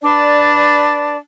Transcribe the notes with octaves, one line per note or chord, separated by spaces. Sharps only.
D4 B4 D5 A5